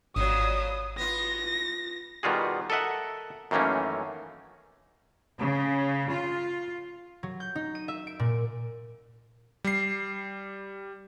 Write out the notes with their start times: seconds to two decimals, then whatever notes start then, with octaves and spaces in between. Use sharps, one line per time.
0.16 G#1 F2 A#2 F#3 D#6
0.98 B3 F4 A#6
2.23 B2 D#3 G3 F4 F#4 G#4
2.70 A4 A#4 D#5 E5 F#5
3.51 F#2 D#3 E3 A3 A#3 C#4
5.37 C#3
6.10 F4
7.23 F#3
7.40 G6
7.55 D#4
7.75 D#7
7.88 E5
8.07 D7
8.19 A#2
9.64 G3 C7